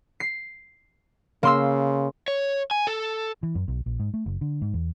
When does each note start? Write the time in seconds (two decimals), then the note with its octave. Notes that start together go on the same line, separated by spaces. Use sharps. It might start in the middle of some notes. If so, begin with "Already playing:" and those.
0.20 C7
1.43 C#3 A#3 C6 E6
2.28 C#5
2.71 G#5
2.87 A4
3.43 E3
3.55 F#2
3.68 B1
3.86 A#1
4.00 G#2
4.14 A3
4.26 F#1
4.41 D3
4.62 G#2
4.74 E2